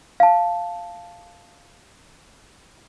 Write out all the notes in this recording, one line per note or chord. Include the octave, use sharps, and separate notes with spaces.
F5 A5